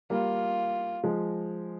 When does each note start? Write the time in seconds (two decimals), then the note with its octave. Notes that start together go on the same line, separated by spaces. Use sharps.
0.10 G3 A#3 F4
1.04 F3 G#3